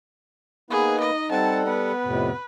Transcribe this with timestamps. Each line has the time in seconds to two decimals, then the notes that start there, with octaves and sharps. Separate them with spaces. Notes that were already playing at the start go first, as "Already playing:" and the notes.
0.71 A#3 B3 D#4 G#4 B4
1.00 D#5
1.31 G3 C4 A4 F#5 A5
1.66 B3 B4
2.05 F2 A2 C3